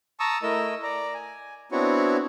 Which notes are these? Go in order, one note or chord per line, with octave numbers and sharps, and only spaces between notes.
A5 A#5 C#6 D#6 E6
A3 E4 A#4 D#5 E6
D5 A#5
G#5
B3 C4 D4 E4 F#4 C#5